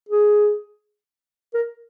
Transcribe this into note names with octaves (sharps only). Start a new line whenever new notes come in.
G#4
A#4